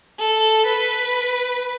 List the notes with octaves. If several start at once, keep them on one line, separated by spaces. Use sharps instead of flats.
A4
B4